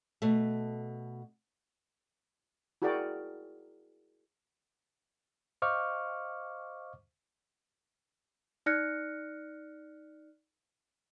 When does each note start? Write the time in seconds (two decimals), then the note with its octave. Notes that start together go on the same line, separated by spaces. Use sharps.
0.22 B2 A3
2.82 E4 F#4 G#4 A#4 D5 G5
5.62 C5 D#5 F5 C#6 D6 F6
8.66 D#4 D5 F6 F#6 A#6 C#7